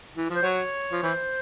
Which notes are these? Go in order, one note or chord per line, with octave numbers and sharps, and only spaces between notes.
E3
F3
C5
F#3 C#5
F3
E3 C5